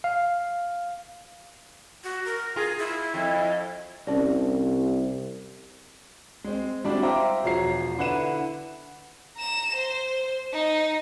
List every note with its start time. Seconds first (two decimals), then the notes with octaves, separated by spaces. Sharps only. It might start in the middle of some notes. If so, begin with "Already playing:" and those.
0.04 F5
2.04 F#4
2.25 A#4
2.56 F4 G#4
2.79 E4
3.14 F2
4.07 C2 C#4 D5
6.44 G#3 C4
6.84 G3 G#3 C4 D4 E4 F#4
7.03 C5 E5 F5 G5 A#5 D6
7.44 E1 F3 F#4 C#5 A#5 C7
7.99 D3 E4 B4 F#5 D#7 E7
9.37 A#5 E7
9.75 C5
10.53 D#4